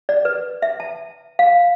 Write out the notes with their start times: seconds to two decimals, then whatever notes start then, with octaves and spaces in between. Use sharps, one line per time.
0.09 D5
0.25 B4
0.62 E5
0.80 A5
1.39 F5